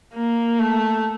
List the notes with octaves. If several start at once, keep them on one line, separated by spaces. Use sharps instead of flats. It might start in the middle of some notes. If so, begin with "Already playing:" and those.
A#3
A3